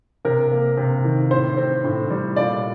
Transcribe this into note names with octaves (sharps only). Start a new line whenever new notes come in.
C3 A#4
A#3
C3
D#3
A2 C5
C4
A2
G3
A#2 D5